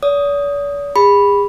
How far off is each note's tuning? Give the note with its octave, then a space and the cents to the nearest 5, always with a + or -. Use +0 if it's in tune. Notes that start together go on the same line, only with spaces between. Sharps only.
D5 -45 D#6 +0
G#4 -40 B5 +0